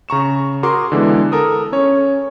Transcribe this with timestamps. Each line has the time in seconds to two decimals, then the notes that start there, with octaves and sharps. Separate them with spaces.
0.09 C#3 A#5 C#6 E7
0.63 F#4 G#4 A#4 C6 D6
0.92 D3 E3 G#3 B3
1.32 A4 A#4 D#6
1.72 C#4 C#5